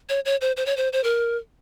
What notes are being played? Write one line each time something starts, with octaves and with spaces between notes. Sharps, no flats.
C#5
C#5
C5
C5
C#5
C5
C5
A#4